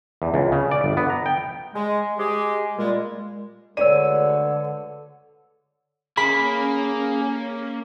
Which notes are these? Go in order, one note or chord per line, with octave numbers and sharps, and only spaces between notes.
E2
C#2
C#3
D5
G1
B3
A#5
G5
G#3
G#3 G4 G#4
A#2 G3 G#3
D2 D3 G#3 B4 C#5 D5 E6 D#7
A#3 C#4 G#4 B5